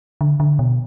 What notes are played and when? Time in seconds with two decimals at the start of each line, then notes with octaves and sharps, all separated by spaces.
0.21 D3
0.40 D3
0.59 B2